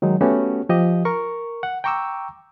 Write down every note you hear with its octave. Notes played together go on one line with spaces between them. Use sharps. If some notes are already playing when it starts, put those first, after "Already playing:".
D#3 F#3 G#3 D#4
A3 B3 C#4 F#4 G4
F3 G4 D#5
A#4 C#6
F#5
G5 A#5 C#6 D6 E6